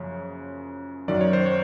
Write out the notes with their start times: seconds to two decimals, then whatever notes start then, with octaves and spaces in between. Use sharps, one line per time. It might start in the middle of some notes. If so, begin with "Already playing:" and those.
Already playing: F#2 C#3 F3 A#3 C#5
1.08 F#2 D#3 F#3 D5
1.21 C#5
1.33 C5
1.46 C#5